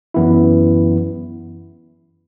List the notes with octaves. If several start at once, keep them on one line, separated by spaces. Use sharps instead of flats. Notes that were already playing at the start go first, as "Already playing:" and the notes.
F#2 E3 B3 E4